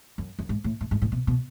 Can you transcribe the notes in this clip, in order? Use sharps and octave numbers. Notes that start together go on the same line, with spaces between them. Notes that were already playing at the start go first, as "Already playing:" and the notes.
F#2
F#2
G#2
A2
A2
G#2
A2
B2
B2